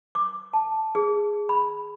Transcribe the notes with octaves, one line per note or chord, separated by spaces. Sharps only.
D6
A5
G#4
B5